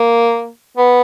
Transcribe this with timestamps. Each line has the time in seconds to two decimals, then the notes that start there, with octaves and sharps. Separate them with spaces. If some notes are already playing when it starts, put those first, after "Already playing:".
Already playing: A#3
0.77 B3